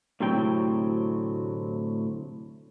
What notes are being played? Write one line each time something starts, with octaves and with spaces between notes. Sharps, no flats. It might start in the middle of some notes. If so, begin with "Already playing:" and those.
D2 A2 C3 F#3 C4 G5